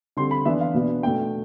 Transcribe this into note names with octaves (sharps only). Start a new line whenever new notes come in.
D3 G3 C4 C6
B5
E3 B3 D4 E5
F5
B2 B3 D4
B2 A3 D4 G5